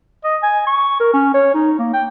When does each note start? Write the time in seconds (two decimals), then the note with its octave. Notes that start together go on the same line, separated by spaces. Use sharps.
0.24 D#5
0.43 G#5
0.67 C#6
1.00 A#4
1.14 C#4
1.34 C#5
1.54 D#4
1.79 A#3
1.93 G5